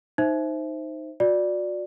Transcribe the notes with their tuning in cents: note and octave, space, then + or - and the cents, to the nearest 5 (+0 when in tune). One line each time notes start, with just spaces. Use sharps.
D#4 +0 C5 +0 E5 +0
F#4 -35 D5 +0